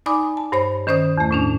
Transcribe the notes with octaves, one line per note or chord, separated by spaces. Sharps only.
D#4 D5 G#5 B5 D6 D#6
A5
G2 C5 C#5 B5
D#3 C#4 C5 D5 D#6
E2 A3
A2 C#4 D4